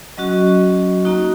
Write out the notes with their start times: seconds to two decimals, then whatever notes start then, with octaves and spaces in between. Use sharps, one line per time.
0.17 F#3 C#4 F#4 D#5
1.05 A#3 D#4 F#4